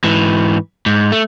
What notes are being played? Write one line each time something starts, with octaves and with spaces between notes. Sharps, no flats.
G#2 E3
G#2
A3